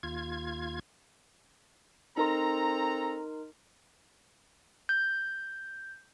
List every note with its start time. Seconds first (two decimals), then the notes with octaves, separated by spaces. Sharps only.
0.03 D#2 F4 G#6
2.17 C4 D#4 A4 A#4 A#5 C6
4.89 G6